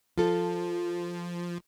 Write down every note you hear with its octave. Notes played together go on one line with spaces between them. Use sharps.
F3 F4 A4